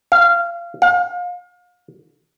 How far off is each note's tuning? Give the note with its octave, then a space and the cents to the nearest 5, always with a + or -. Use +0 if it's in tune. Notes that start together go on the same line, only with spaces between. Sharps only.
F5 -20
F5 +35